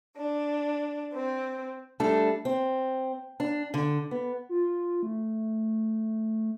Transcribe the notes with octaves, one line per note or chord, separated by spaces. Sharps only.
D4
C4
G3 A3 D4 A4
C4
D4
D3
B3
F4
A3